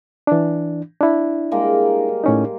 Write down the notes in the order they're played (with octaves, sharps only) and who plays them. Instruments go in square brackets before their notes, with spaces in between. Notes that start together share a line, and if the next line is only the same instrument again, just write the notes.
[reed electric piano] E3 D4
D4 E4
[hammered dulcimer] G3 G#3 A#3
[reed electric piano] A2 C#4 D#4